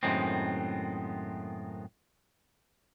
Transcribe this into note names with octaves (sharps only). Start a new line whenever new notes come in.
F#2 A2 D#3 G#3 B3 C4